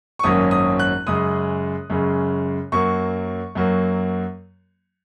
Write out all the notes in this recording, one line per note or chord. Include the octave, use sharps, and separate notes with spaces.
C#6
G#1 F#2 F#3 A#3 C#4 D#6
D#6
F#6
F#2 C#3 G#3 D#6
F#2 C#3 G#3
F#2 F#3 A#3 C#6
F#2 F#3 A#3